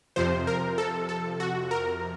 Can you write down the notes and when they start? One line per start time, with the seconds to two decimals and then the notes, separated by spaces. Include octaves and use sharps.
0.16 F2 C3 F3 C5
0.47 A#4
0.78 A4
1.09 A4
1.40 F#4
1.71 A#4